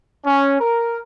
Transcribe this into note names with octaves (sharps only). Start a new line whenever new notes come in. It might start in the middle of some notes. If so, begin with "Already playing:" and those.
C#4
A#4